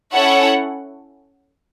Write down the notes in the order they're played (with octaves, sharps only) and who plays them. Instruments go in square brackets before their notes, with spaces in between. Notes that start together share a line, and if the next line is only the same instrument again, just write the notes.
[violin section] C#4 E4 A4 C#5 F#5